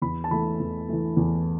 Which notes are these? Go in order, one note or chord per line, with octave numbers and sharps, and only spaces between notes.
E2 B5
A5
E3 A3 B5
E2
E3 A3
E2